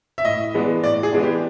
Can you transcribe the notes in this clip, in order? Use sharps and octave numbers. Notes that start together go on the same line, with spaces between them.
E5
A2 D#5
E3 G#3 B3 D4
A2 D5
G#4
E3 G#3 B3 D4
G4